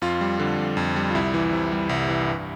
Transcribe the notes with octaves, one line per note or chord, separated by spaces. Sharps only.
F2 F4
G3
D3
F2
F2
G3
F4
C2 E4
E3
C3
G3
C2
E3
G2